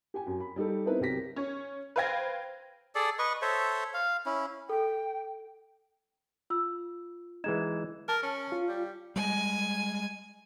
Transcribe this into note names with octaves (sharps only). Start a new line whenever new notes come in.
G4 G5 G#5
F#2
B5
G3 D#4 G4 A4
B3 C4 D#4 E4 A#4 B4
C2 F#3 G4 A#4 A#6 B6
C#4 C#5
B4 C5 F5 G5 G#6 A#6
G#4 A4 D5
B4 D#5 C#6
A4 C5 C#5 E5
F5
C#4 E4
A4 G5
F4 E6
E3 G#3 D#4 G#6 E7
A#4 A5
C#4
F4
G3
G3 G#3 G#5